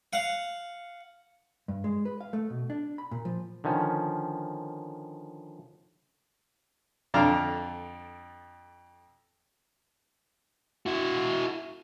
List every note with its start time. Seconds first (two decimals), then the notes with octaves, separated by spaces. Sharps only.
0.13 F5 F#5
1.68 G2
1.84 G#3
2.05 B4
2.21 F5
2.33 A3
2.50 B2
2.70 D4
2.98 B5
3.11 A#2
3.25 F3
3.64 D3 D#3 F3 C#4
7.14 F2 D3 D5 F5 A5 A#5
10.86 E4 F#4